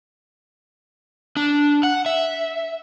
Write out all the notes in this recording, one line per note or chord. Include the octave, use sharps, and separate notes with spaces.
D4
F#5
E5